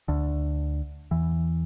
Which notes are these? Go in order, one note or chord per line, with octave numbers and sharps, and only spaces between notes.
D2 D3
E2 E3